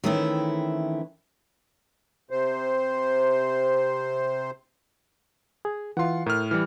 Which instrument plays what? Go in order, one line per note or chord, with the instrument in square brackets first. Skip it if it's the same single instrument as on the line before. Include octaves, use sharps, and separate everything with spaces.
[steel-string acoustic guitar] D#3 E3 A3 C4 C#4 E4
[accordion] C3 C5
[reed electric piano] G#4
[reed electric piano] E3 F4 F5 [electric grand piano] F#5 C6
[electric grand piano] A2 F6 [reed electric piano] A#4
[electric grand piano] E3 G3 [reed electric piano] F6